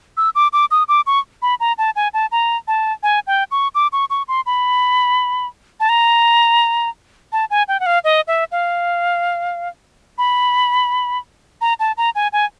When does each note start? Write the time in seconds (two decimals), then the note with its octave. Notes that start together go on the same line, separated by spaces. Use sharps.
0.17 E6
0.35 D6
0.53 D6
0.71 D#6
0.88 D6
1.07 C#6
1.42 B5
1.60 A#5
1.78 A5
1.96 G#5
2.14 A5
2.32 A#5
2.68 A5
3.03 G#5
3.27 G5
3.51 C#6
3.75 D6
3.93 C#6
4.10 C#6
4.28 C6
4.46 B5
5.80 A5
5.89 A#5
7.32 A5
7.51 G#5
7.68 G5
7.80 F#5
7.86 F5
8.04 D#5
8.28 E5
8.52 F5
10.18 B5
11.61 A#5
11.80 A5
11.97 A#5
12.15 G#5
12.33 G#5